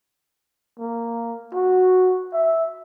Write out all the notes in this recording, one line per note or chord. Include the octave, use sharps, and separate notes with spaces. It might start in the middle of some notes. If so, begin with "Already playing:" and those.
A#3
F#4
E5